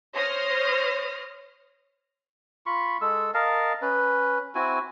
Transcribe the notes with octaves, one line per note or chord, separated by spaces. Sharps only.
C5 C#5 D#6 F6 A#6
F4 B5 C#6
G#3 A4 E6
A#4 D#5 F5 A5
C#4 B4
C4 E4 F#4 G#5